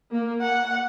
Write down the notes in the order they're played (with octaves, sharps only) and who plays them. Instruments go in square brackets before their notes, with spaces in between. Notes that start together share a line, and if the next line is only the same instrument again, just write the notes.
[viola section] A#3
[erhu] F#5